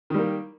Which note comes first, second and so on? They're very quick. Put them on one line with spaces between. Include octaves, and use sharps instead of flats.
D#3 G3 A#3